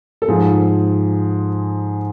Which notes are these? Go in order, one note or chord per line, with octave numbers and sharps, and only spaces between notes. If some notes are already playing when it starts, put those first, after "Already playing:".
A4
G#2 F3 G#4